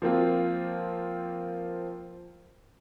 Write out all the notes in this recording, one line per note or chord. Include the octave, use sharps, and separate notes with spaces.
F3 A#3 C4 F4